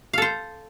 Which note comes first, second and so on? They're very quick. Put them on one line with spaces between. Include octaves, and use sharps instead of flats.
F5 A4 C5